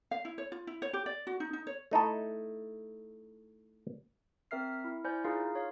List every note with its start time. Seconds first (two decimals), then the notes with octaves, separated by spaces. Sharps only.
0.11 F5
0.25 E4
0.38 C#5
0.52 F4
0.67 E4
0.82 C#5
0.93 G4
1.06 D5
1.27 F#4
1.40 D#4
1.53 D#4
1.67 C#5
1.91 A3 D#4 E4 A4
4.51 C4 A#4 E5 F6 C7
4.84 E4
5.04 E4 C5 D5 G#5 G6
5.24 D#4 F4 G#4 A#4 F5
5.55 C#5 F5